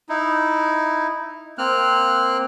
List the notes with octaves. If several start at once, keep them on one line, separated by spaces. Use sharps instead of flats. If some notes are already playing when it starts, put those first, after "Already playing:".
D#4 E4
A#3 C4 F6 F#6